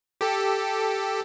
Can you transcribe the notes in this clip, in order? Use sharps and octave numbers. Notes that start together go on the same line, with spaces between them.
G4 A4